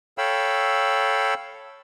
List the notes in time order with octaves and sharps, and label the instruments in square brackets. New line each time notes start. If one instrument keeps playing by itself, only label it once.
[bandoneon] A4 C#5 F5 G5 B5 E6